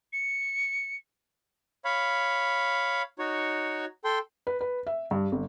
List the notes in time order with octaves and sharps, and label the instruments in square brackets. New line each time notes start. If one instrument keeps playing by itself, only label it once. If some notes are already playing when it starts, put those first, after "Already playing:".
[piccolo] C#7
[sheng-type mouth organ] C#5 F5 B5
D#4 F#4 C#5
A4 G5 C6
[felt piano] B4
B4
E5
G2
G1